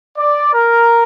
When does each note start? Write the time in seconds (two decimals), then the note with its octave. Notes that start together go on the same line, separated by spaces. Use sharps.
0.18 D5
0.54 A#4